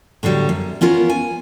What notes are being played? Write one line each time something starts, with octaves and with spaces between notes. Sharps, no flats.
A2 D3 F#3 G3
F#2
B3 C#4 F4 A#4
G#5